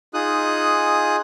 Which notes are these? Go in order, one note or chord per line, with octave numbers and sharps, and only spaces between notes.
D#4 F4 G#4 D#6 F#6